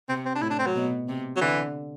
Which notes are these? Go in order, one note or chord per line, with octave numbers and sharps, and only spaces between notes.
C3 C4
C4
D4
A2 E4
D4
C4
F#3
B2
C3
F#3
D3 E3